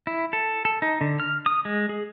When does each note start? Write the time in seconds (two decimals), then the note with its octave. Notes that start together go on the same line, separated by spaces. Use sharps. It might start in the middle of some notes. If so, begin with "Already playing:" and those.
0.07 E4
0.33 A4
0.65 A4
0.82 D#4
1.01 D3
1.20 F6
1.46 D#6
1.65 G#3
1.89 G#4